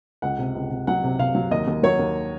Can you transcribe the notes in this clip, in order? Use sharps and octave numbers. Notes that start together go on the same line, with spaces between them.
C#2 F#5
C3
C#2
C3
F#3 F#5
C3
C3 F5
F#3
D#2 D#5
D#2
F#3 C#5
D#2